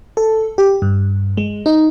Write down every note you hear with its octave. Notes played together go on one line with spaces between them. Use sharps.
A4
G4
G2
G#3
D#4